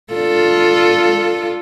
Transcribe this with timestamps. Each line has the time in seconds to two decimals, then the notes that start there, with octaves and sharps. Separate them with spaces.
0.13 D4 F4 A4